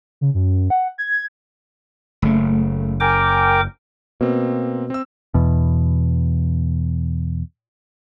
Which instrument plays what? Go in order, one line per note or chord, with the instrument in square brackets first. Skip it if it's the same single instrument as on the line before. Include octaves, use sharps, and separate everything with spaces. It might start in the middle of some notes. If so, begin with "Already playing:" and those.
[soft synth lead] C#3
F#2
F#5
G#6
[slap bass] F#1 C#3 [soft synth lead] A3
[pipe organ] A#4 G5 D6 [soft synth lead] G#5
[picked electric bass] B2 [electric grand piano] A#3 C4
[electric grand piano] C4 E6
[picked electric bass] E2 B2